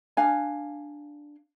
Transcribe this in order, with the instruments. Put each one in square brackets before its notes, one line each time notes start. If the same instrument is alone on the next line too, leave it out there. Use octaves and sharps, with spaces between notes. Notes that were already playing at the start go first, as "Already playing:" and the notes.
[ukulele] D4 F5 G#5